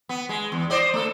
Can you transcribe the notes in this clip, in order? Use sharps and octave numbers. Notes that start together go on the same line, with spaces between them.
B3
G#3
E2
C5 D5 D#5
A3 A4